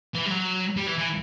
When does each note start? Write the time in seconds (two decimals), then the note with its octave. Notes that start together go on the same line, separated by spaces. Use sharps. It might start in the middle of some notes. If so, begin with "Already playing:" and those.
0.15 E3
0.26 G3
0.31 F#3
0.77 G3
0.87 E3
0.98 E3